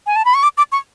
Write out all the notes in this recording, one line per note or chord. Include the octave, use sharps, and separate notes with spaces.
G#5
A5
B5
C#6
D6
D6
C#6